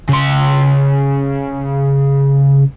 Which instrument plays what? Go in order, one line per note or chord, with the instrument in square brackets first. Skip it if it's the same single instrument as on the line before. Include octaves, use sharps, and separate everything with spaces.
[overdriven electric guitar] C#3 C6